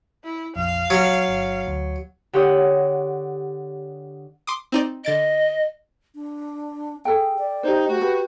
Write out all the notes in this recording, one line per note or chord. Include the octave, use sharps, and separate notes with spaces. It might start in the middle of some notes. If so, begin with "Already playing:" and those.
E4
A#1 F2 F5
A#1 F#3
G1
D2
D3 G4 C#5 F#5 D#6
C6 D6 D#6
C4 D#4 D5
D3 D#5 A6 D7
D4
G#4 A4 G5
D5
D#4 G4 C5
A3 F#4
G4 B4